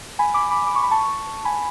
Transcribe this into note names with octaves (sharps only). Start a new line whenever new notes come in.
G#5 B5
B5 D6
B5 D6
D6
C#6
B5
A5 C#6
G#5 B5